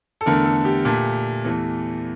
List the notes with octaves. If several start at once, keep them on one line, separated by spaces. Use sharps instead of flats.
A4
E2 D3 A3 A#4
A4
G4
A#2 A3
E2 E3 A3